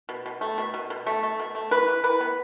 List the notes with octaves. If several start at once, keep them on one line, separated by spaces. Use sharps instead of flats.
B2
B2
A3
B2
B2
B2
A3
A3
B2
A3
E3 B4
E3
E3 B4
B3